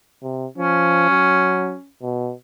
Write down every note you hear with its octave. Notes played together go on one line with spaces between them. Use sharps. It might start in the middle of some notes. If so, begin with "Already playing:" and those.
C3
F3 C#4
F#3
B2